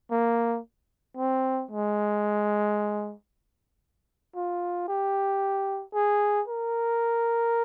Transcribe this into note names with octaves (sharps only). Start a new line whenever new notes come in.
A#3
C4
G#3
F4
G4
G#4
A#4